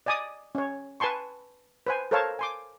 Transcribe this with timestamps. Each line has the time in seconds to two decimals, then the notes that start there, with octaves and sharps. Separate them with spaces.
0.06 D5 D#5 G#5 D6 D#6
0.55 C#4 C#5
1.00 B4 G#5 A5 C6 C#6
1.87 B4 C5 G#5
2.11 A4 A#4 C5 C#5 F5 A5
2.39 G#5 C6 D6